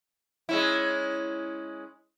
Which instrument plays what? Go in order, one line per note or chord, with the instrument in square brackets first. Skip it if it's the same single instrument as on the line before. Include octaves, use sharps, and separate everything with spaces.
[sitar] G#3 C#4 E4